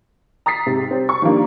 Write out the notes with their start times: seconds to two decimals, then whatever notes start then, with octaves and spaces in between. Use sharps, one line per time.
0.46 A#5 D#6 A6 B6 C7
0.66 G#2 C3
0.91 G3 C4
1.09 C#6
1.22 D#3 F3 G3 A#3 D4